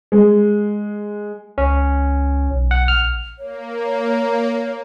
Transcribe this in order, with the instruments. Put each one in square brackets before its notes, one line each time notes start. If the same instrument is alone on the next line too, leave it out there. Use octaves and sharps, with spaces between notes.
[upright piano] G#3
[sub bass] C#2 [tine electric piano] C#4
[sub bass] B1
[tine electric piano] F#5
[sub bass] A#1 [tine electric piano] F6
[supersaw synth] A#3 [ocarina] C#5